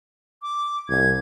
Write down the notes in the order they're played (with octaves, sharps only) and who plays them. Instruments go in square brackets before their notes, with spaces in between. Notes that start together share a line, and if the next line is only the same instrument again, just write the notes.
[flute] D6
[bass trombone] C2 [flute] G#6